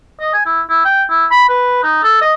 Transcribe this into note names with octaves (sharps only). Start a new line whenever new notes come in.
D#5
G#5
E4
E4
G5
E4
B5
B4
D#4
A4
D#5